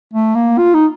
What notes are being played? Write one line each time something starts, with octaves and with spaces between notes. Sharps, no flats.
A3
A#3
F4
D#4